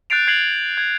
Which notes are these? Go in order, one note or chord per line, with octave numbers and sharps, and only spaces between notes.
F#6 G6 A6 C7 D7 F7
G#6 C7 F7 F#7
G#6